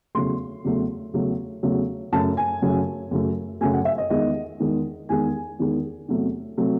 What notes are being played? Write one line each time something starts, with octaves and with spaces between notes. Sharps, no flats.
E2 C#3 F#3 A3 C6
E2 C#3 F#3 A3
E2 C#3 F#3 A3
E2 C#3 F#3 A3
F#2 C#3 F#3 A3 A5
G#5
F#2 C#3 F#3 A3
F#2 C#3 F#3 A3
F#2 C#3 F#3 A3 G#5
F#5
E5
D#5
E2 D#3 G#3 D#5
E2 D#3 G#3
E2 D#3 G#3 G#5
E2 D#3 G#3
E2 C3 F#3 A3
C3 F#3 A3